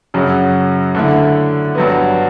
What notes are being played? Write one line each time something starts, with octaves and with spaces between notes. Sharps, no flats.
F#2 C#3 F#3
D3 A3 E4
G2 F#3 B3